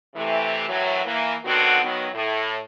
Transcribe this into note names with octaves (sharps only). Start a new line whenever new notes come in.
C3 E3 A3
F#2 A2 E3 F#3
E3 A#3
D3 D#3 F#3 B3 C4 F#4
D#3 F#3 B3
A2